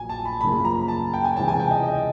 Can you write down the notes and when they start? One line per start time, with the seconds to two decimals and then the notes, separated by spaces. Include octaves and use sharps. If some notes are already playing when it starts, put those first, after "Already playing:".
Already playing: A#1 A#2 F#3 G#5
0.09 A5
0.25 B5
0.41 F#2 C#3 F3 A#3 B5
0.65 A#5
0.88 A5
1.14 G5
1.24 G#5
1.35 C#2 C3 E3 G#3 C#4 A5
1.48 G#5
1.60 G5
1.71 D#5
1.83 D#5